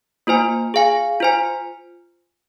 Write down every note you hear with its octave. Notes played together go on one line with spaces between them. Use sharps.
A#3 F4 C5 G#5
G#4 F5 G#5
F4 C5 G#5